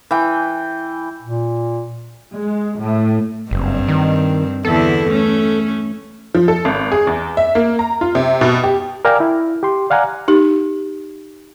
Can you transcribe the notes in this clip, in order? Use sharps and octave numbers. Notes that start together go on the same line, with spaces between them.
E3 G5
A#2
G#3
A2
F#1 G2 C4
D#3
E2 D3 E4 A4
A3 C#4
F3
A4
G#1
G#4
E2
E5
A#3
A#5
F4
C3
B2
G4
A#4 D5 F5 G5 G#5 A#5
E4
G4 C6
D5 F5 F#5 G#5 A#5
D#4 G4